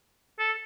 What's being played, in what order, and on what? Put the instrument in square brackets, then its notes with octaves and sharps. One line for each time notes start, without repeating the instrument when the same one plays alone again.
[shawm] A4